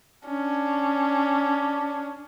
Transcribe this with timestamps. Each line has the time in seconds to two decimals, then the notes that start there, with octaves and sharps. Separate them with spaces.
0.26 C#4 D4